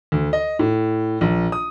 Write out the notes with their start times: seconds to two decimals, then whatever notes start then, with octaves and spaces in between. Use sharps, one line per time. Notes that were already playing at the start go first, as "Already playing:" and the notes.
0.12 D2
0.33 D#5
0.59 A2
1.21 A#1
1.52 D#6